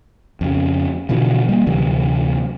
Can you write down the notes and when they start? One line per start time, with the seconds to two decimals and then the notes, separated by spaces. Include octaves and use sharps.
0.41 F2 C#3
1.09 B2 D3 E3 F3
1.49 G3 A#3
1.66 D2 C3 E3 F#3